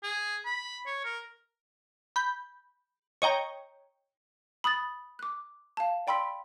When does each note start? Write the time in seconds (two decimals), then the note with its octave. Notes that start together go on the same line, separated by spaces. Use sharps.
0.03 G#4
0.45 B5
0.86 C#5
1.05 A#4
2.16 B5 G6
3.22 C#5 D#5 G5 A#5
4.64 B5 D#6 F#6 A6
5.19 D6 F#6
5.77 F5 A5
6.07 D5 G5 B5 C6 E6 B6